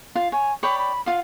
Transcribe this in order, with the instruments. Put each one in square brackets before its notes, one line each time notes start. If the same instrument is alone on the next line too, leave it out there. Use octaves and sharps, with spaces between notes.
[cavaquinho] F4 F5
[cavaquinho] C#5 [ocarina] G#5
[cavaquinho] C#5 D5 G5 [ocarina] B5
[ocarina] B5
[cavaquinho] F4 F5 [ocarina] F#5